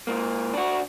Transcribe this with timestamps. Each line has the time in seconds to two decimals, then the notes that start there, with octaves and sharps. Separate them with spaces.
0.07 G#2 A#3
0.54 D4 F#4